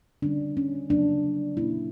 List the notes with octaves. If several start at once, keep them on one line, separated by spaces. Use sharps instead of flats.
D3 G3 C#4 D4
C#4
C#3 F#3 A#3 C#4 D4
A#2 A#3 C#4 E4